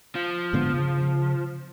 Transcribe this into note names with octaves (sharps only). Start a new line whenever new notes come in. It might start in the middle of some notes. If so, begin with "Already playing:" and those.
F3
G#2 D3 B3
C#3